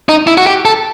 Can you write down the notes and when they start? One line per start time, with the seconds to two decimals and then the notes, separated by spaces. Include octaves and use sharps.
0.09 D#4
0.27 E4
0.38 F#4
0.47 G4
0.65 A4